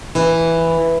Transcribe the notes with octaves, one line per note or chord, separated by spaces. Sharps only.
E3